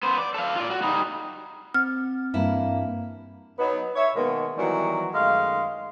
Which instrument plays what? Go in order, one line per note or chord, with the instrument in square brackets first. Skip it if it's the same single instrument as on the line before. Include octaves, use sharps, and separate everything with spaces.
[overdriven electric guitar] B3 C5
D5
A4 F5
F4 D5
F#4
G3 D#4
[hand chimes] C4 [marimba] F6
[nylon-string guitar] G2 E3 E4 [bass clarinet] A#3
[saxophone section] F#3 B3 D#4
C#5 E5
B2 D#3 G#3 A#3 B3
D#3 E3 F#3 G3 B3 F#4
F#2 D#3 G#3 A3 F5